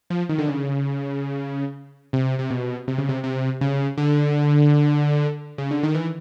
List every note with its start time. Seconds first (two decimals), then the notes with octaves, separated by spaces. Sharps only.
0.10 F3
0.29 D#3
0.38 D3
0.48 C#3
2.13 C3
2.39 C3
2.50 B2
2.88 C3
2.98 C#3
3.09 C3
3.24 C3
3.61 C#3
3.97 D3
5.58 C#3
5.71 D3
5.83 D#3
5.94 E3